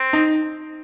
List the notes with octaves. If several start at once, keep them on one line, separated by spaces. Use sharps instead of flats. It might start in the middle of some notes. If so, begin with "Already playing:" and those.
Already playing: C4
D#4